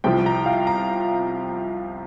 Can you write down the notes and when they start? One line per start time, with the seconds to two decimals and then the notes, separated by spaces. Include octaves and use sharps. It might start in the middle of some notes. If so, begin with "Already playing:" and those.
0.04 C2 C3 F3 G5
0.26 A#5
0.46 F5
0.67 A#5